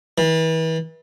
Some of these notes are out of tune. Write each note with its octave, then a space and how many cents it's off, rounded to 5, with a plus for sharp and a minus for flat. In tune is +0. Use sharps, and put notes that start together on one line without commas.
E3 -35